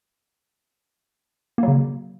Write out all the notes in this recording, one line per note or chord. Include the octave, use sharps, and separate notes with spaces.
C#3 F#3 A#3